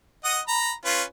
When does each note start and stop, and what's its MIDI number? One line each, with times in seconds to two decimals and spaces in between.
0.24 0.40 75
0.24 0.40 78
0.24 0.40 87
0.48 0.72 82
0.48 0.72 83
0.85 1.03 61
0.85 1.03 65
0.85 1.03 71